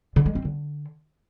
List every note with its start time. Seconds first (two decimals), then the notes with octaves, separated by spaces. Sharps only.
0.16 D3
0.26 G#3
0.35 C4
0.45 D3